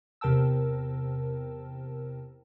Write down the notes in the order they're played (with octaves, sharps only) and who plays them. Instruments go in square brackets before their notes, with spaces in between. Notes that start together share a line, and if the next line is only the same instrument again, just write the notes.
[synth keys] E2 C3 A#4 G5 A5 E6